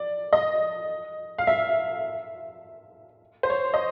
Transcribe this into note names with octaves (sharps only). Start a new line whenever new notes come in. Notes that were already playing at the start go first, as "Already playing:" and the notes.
Already playing: D5
D#5
F5
E5
C5
C#5
D#5